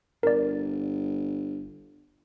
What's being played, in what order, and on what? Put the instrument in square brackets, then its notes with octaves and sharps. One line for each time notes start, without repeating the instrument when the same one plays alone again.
[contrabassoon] G1 [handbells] A#4 D5